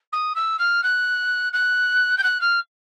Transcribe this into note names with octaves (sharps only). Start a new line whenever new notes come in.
D#6
E6
F6
F#6
F#6
G6
F#6
F6